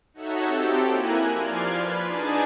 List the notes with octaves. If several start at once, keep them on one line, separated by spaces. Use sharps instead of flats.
D#4 F#4 A4 C#5 E5 F#5
C4 G4 A4
A#3 E4 G#5 A#5 F#6
F3 D5 C6 F6 G#6
B4
D4 D#4 G#4 D5 G#5 A5